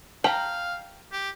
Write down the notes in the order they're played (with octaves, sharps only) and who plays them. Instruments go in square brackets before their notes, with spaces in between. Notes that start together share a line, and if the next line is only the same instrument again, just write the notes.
[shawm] F5 [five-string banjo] G5 A#5 [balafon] A5
[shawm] G4